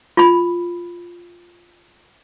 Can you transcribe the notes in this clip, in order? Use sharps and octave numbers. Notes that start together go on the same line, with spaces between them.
F4 B5